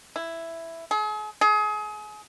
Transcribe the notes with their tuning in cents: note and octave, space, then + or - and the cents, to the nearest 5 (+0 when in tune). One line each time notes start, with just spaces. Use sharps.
E4 +5
G#4 +40
G#4 +30